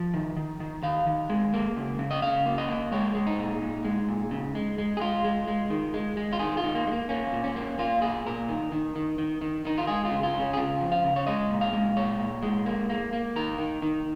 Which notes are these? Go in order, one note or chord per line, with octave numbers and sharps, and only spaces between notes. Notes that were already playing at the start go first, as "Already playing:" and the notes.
Already playing: F3
D#3
D#3
D#3
D#3 F5
D#3
G#3
A#3
C#3
C#3
D#5
C#3 F5
A#3
D#5
A#3
G#3 C#5
G#3
D#4
A#2
A#2
G#3
A#2
C#3
G#3
G#3
G#4
G#3 F4
G#3
G#3
D#3
G#3
G#3
F4
D#3 G#4
F4
D#3
A#3
G#3
A#3
A#3 C#4
A#2
C#4
A#3
A#3 F4
A#2 G#4
A#2 A#4
D#3
D#3
D#3
D#3
D#3
D#3 D#4
F4
G#3 G#4
F4
C#3
F4
C#3
C#4
G#4
C#3 F4
F3
F5
C#3
C#5
G#3 D#5
A#2
F5
G#3
A#2 C#5
A#2
G#3
A#3
A#3
A#3
D#3 A#4
D#3
D#3